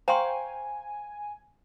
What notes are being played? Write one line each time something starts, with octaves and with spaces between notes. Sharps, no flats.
C5 F5 G5 G#5 A#5 C6 C#6